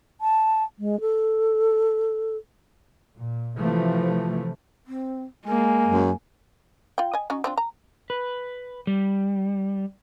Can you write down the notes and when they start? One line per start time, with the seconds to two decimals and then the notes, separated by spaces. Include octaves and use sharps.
0.21 A5
0.79 G#3
1.01 A4
3.16 A#2
3.59 C3 E3 F3 A3
4.87 C4
5.46 G#3 A#3 G#5
5.87 F#2
6.98 F4 G5
7.13 D#5 G#5
7.30 C#4 D#4 F#4
7.44 C4 D4 F4
7.57 A#5
8.10 B4
8.87 G3